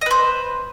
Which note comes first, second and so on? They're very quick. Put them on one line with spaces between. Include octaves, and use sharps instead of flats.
D#5 B4 C5